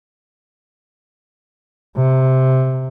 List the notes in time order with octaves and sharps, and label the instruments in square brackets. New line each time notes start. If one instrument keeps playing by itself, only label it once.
[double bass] C3